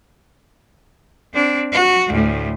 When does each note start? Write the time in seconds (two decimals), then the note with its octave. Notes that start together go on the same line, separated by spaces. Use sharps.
1.34 C4 D4
1.72 F#4
2.08 D2 A2